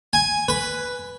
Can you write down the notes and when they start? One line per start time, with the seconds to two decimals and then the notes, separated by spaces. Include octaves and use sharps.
0.13 G#5
0.48 B4